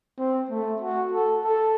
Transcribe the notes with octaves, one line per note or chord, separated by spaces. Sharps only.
C4
A3
F#4
A4
A4